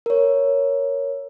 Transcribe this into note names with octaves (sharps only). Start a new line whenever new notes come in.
A#4 C#5